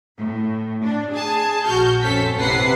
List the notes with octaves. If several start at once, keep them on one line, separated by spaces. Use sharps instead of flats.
A2
D4
G#4 G#5 A5
A#1 F#4 F6 G6
F2 C4 C#4 A4 B6
A1 C3 B4 F#5 C7